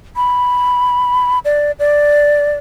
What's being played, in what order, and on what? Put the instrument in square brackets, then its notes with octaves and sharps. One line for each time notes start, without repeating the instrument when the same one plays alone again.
[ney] B5
D5
D5